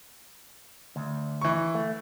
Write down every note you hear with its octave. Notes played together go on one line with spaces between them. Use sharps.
D2
E3 C#6
A3